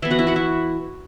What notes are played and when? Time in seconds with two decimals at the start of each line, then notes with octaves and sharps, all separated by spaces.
0.02 E3 B3 E4 E5
0.11 F#4 F#5
0.19 E4 E5
0.27 F#4 F#5
0.36 E4 E5